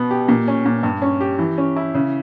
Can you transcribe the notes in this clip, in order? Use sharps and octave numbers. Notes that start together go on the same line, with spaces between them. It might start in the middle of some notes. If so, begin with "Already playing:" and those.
Already playing: B2 B3
G4
A#2
C#4
A#2
G2
C#4
G4
E3
C#4
E4
C#3